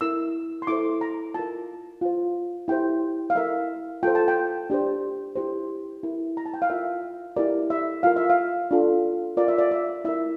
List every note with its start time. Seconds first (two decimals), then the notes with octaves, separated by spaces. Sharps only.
0.01 E4 A#4 E6
0.62 C6
0.67 E4 A4 C5 D6
1.01 A#5
1.34 F4 A#4 A5
2.01 F4 C5
2.68 E4 G4 C5 G5
3.30 F5
3.35 E4 A#4 E5
4.03 F4 A4 C5 G5
4.15 A5
4.28 G5
4.70 D4 G4 C5
5.36 E4 G4 C5
6.03 E4 A#4
6.37 A#5
6.46 A5
6.54 G5
6.62 F5
6.70 F4 A#4 E5
7.36 E4 G4 A#4 D5
7.70 E5
8.03 F4 A#4 F5
8.16 E5
8.30 F5
8.71 D4 F4 A4
9.37 F4 A#4 D5
9.48 E5
9.58 D5
9.71 E5
10.05 E4 A#4 E5